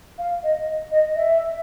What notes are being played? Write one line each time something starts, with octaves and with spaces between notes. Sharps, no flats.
F5
D#5
D#5
E5